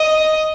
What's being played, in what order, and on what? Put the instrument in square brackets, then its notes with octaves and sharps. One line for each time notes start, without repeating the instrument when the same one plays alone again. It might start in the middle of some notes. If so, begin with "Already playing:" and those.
Already playing: [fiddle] D#5